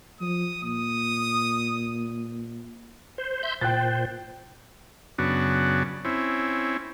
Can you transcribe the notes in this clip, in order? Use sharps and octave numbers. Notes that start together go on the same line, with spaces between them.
F3 D#6
A#2 D#6
C5
E5 C6 G6
A#2 C5 G5 F#6 A6
F#2 C#3 B3 D4 F#4
C4 C#4 E4